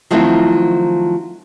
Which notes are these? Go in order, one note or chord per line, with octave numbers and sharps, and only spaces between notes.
D#3 F3 F#3 A3 C4 E4